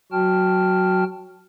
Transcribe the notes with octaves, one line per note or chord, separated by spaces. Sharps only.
F#3 F#4 G5 A5 F6